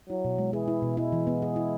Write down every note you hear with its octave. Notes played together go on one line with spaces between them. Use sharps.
F#3 E4
B2
G#3
E3 G#4
E4
B2
G#3 E4
E3
B3
G#4
E4